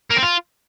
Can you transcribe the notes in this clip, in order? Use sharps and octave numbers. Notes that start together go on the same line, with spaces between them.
A#3
C4
F4